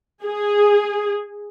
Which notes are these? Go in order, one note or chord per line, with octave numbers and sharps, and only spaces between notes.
G#4